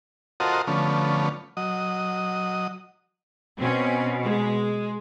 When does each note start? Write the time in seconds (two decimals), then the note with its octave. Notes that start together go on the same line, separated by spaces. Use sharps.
0.40 F4 F#4 A4 A#4 C5 D#5
0.67 D3 F3 A3 B3 C#4
1.57 F#3 D#5
3.60 B2 C4 C#4
4.23 G#3